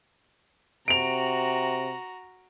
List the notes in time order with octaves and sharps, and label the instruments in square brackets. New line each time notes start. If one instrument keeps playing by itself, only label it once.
[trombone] C3 [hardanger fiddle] F#4 A#5 [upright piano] D7 F7